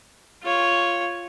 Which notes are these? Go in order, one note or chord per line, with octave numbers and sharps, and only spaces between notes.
F4 C#5